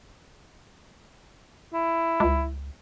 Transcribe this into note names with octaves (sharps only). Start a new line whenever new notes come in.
E4
C#2